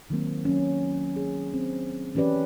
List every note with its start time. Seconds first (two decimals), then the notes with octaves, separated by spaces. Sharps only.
0.10 D#3 F#3 A#3 C4
0.45 F#3 C#4
1.16 G#4
1.53 C4
2.15 E3 C#4 G4 B4 D5